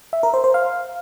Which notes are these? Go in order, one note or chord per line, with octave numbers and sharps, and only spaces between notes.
E5
A#4
C5
C5
F5